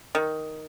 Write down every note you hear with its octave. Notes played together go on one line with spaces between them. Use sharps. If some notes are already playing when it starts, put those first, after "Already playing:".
D#3